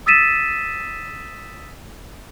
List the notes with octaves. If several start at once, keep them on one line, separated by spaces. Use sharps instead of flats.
D#6 E6 A6 B6 D#7 E7